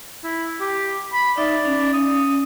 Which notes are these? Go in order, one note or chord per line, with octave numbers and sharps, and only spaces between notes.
E4
G4
B5
D#4 D5 E5
C#4
D#6